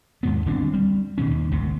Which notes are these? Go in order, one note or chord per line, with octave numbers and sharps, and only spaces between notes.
D#2 G#2 B3
G1 D#2 C4 D4
G3
B2 D#3 C#4
D#2
G#1 D2 C3